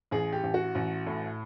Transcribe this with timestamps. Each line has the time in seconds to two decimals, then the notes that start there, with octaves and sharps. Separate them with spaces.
0.11 A1 G#4
0.33 G4
0.44 A1
0.54 F#4
0.75 A1
1.07 A2